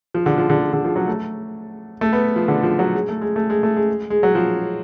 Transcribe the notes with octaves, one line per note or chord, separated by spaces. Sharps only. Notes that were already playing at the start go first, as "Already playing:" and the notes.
F3
D3
F3
D3
D3
F3
F#3
A3
A3
B3
F3
D3
F3
F#3
G#3
A3
G#3
A3
G#3
A3
G#3
G#3
F#3
F3